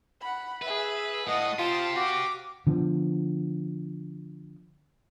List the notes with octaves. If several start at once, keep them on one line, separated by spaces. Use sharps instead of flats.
F#5 B5
G#4 B4 E5
A2 A3 D#5 F#5 D#6
F4 G4 C5 F5 A5
F#4 D6
D3 F3 B3